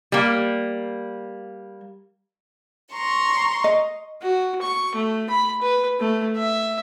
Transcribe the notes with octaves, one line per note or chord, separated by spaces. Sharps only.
G3 A#3
A#5 C6 C#6
D#5
F#4
C#6
A3
B5
B4
A3
E5